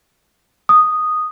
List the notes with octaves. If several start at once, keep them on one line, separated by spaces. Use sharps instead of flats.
D#6